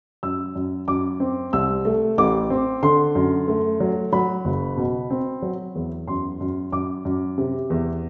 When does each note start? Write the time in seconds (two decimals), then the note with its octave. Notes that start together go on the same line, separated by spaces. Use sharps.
0.23 F#2 E6
0.55 F#2
0.88 F#2 D6
1.20 C4
1.53 C2 E6
1.85 A3
2.18 A1 D6
2.50 C4
2.83 D3 C6
3.15 F#2
3.48 A3
3.80 F#3
4.13 F#3 B5
4.45 F#1
4.77 B2
5.10 C4
5.42 F#3
5.75 E2
6.07 F#2 C6
6.41 F#2
6.72 F#2 D6
7.05 F#2
7.38 C3
7.70 E2